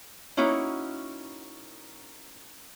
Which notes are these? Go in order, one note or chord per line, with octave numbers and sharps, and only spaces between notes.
A#3 C#4 D#4 E4 F#4